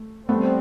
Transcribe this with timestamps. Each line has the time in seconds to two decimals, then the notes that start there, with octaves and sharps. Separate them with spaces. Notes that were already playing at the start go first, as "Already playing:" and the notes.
Already playing: A3
0.29 G3 A3 B3 C4